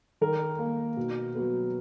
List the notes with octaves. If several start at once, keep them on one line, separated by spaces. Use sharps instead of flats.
D#3 A#4
A#3
B2
F#3 B3